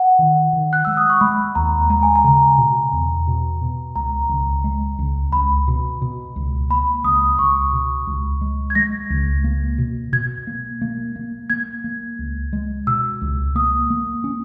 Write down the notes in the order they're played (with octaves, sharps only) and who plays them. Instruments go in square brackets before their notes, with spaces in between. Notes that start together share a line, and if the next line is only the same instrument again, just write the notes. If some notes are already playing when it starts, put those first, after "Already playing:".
Already playing: [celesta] F#5
[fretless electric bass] D#3
D#3
[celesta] F#6
[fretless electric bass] G#3 [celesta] E6
[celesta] D#6
C#6
[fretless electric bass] G#3 [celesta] B5
[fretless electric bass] D#2 [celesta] A#5
[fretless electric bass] G#3 [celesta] A#5
[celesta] G#5
A#5
[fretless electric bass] C#3
B2
E2
B2
B2
[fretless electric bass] C#2 [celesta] A#5
[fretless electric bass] C#2
G#3
C#2
[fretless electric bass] C#2 [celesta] B5
[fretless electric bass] B2
B2
C#2
[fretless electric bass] A#3 [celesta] B5
[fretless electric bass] C#2 [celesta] D#6
[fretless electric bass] C#2 [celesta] C#6
[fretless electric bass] B2
C#2
G#3
[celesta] G#6
[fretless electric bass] G#3 [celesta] A#6
[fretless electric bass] C#2
A#3
B2
[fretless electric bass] B2 [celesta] G#6
[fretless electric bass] A#3
A#3
A#3
[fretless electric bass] A#3 [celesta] G#6
[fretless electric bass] A#3
C#2
G#3
[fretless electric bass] B2 [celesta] E6
[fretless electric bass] C#2
[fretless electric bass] A#3 [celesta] D#6
[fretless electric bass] A#3
C#4